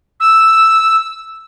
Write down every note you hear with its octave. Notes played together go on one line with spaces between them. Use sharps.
E6